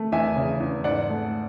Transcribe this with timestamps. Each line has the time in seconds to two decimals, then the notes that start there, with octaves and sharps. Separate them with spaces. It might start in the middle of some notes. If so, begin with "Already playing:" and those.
Already playing: A3
0.12 E2 E5 G#5
0.37 C#3
0.60 E2
0.84 G#2 D5 F#5
1.09 A3